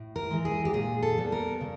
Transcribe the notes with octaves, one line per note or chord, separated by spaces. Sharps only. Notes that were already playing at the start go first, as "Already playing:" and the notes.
Already playing: A2
A#4
E3 G#3
G#4
G4
A#2 G#4
A4
G3 B3
A#4
C#3